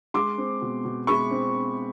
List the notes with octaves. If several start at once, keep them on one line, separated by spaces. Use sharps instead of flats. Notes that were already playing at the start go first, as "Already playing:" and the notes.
G#3 C6 D6
C4
B2
B2
G#3 B5 C#6
C4